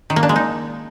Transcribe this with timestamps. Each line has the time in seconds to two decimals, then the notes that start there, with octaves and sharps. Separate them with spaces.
0.10 D#3
0.16 A#3
0.23 D4
0.29 G#3
0.36 D#4